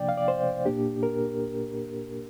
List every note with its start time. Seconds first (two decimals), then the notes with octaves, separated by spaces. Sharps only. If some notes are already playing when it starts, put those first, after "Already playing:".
Already playing: C3 F3 A#3 D4 D5 G5
0.09 F5
0.17 D5
0.28 C5
0.66 A#2 A#3 D4 G4
1.03 A#4